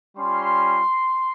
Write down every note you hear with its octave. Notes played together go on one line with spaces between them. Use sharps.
G3 C#4 F4 C6